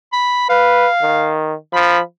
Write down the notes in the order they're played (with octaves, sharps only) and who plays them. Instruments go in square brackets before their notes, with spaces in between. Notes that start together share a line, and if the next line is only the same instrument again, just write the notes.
[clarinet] B5
[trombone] B4 [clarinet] F5
[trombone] D#3
[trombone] F3 [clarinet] B5